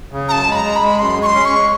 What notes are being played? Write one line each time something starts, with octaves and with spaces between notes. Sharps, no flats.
C#3
F#2 A5 A#5
G#3
B5
A#5
G#3
B5
G#3
F#2 C6
G#3
C#6
C6
C#4
C#6
G#3